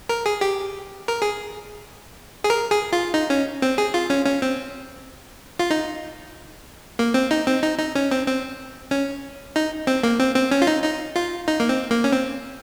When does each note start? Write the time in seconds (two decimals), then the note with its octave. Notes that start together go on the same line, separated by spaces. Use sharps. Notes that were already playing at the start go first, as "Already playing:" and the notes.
0.09 A#4
0.26 G#4
0.41 G4
1.08 A#4
1.22 G#4
2.44 G#4
2.50 A#4
2.71 G#4
2.93 F4
3.14 D#4
3.30 C#4
3.62 C4
3.78 G#4
3.94 F4
4.10 C#4
4.26 C#4
4.42 C4
5.59 F4
5.70 D#4
6.99 A#3
7.14 C4
7.31 D#4
7.47 C4
7.63 D#4
7.79 D#4
7.95 C#4
8.11 C4
8.27 C4
8.91 C#4
9.56 D#4
9.87 C4
10.03 A#3
10.20 C4
10.36 C4
10.51 C#4
10.62 F4
10.67 D#4
10.84 D#4
11.16 F4
11.48 D#4
11.60 A#3
11.69 C4
11.91 A#3
12.04 C#4
12.12 C4